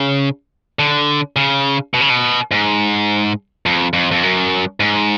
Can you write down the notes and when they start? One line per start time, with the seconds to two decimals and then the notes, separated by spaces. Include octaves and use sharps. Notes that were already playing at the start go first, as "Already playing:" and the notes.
Already playing: C#3
0.79 D3
1.36 C#3
1.94 B2
2.01 C#3
2.10 B2
2.51 G#2
3.66 F2
3.93 F2
4.11 F2
4.23 F#2
4.80 G#2